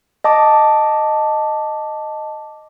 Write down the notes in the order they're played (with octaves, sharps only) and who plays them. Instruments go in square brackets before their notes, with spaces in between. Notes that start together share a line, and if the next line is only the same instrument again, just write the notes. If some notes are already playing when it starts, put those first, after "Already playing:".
[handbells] D#5 A5 D6